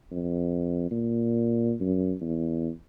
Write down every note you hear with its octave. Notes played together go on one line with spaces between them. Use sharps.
F2
A#2
F#2
E2